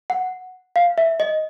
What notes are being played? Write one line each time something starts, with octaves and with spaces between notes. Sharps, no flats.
F#5
F5
E5
D#5